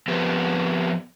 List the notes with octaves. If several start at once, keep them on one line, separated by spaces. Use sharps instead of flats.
F3 B3 C4 G4 A#4 B4